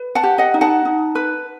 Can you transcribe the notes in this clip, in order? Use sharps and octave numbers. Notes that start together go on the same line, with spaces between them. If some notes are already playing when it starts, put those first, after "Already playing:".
Already playing: B4
F#5 A5
G4
D#5 F#5
D#4
F#5 A5
D#4
B4